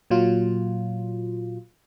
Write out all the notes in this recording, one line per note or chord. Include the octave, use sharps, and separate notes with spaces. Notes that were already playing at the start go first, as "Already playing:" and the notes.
A#2 F#3 F4